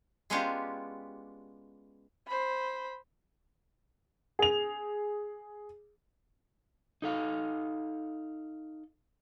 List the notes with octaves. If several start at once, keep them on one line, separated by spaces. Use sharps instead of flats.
G#3 B3 C#4 D4 F4 G4
C5 B5
G#4 F7
D#4 A4 F5